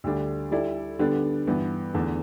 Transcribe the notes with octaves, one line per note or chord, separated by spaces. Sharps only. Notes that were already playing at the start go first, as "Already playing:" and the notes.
D2 D3 G3 D4
G3 E4 A4 D5
D3 G3 B3 D4
G2 E3 B3
E2 D3 A3